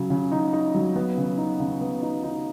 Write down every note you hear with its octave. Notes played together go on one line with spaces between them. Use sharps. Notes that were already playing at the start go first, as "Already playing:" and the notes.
Already playing: C#3 F#3
C#3
D#4
D#4
F#3
B3
C#3
D#4
C#3
B3
D#4
D#4